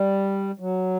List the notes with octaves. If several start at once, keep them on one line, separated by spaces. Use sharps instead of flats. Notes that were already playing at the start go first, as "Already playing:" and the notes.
Already playing: G3
F#3